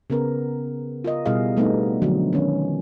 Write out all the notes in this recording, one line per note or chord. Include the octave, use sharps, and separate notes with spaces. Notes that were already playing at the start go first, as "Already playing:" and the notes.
C#3 B3 A#4
F4 A#4 D#5
B2 G3 E4 G#4 D#5 F5
G3 A3 B3 C4 D#4
D3 F3 F#3 D4
D#3 B3 C#4